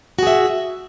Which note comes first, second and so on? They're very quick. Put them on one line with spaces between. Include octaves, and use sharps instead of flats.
F#4 G#4 E5